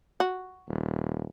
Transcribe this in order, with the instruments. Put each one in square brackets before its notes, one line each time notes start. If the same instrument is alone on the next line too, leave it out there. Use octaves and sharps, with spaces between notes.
[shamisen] F#4
[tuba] D#1